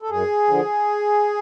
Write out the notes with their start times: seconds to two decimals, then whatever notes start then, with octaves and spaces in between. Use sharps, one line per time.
0.02 A4
0.10 F#2 G#4
0.47 D3 F3